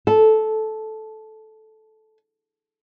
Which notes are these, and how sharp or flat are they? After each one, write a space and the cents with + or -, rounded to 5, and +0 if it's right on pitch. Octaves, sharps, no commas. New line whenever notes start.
A4 -10